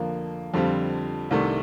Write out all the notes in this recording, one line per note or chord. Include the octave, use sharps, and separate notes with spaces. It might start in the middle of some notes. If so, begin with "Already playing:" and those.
Already playing: F2 D3 F3 A#3
F2 D3 G3 C4 F4
C2 C3 D#3 A3 D4